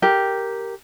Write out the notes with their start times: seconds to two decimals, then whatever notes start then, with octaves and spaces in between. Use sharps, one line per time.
0.02 G4 A#4